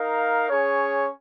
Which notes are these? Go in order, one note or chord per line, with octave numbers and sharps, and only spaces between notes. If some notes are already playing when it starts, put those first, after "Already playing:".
Already playing: D#4 A#4 F5
C#4 G#4 C#5